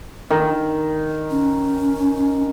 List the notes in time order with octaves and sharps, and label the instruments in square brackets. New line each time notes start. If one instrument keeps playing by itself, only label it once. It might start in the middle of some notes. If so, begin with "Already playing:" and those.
[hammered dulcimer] D#3
[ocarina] C#4